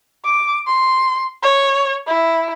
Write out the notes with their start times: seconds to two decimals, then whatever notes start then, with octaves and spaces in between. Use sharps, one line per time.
0.25 D6
0.67 C6
1.43 C#5
2.07 E4